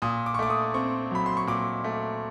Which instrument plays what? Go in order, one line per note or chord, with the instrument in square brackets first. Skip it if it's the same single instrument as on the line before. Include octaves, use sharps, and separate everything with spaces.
[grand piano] A#2 D#6
D6
C#6
A3 D6
D#6
C4 C#6
F#3 B5
C6
C#6
A#2 D6
A3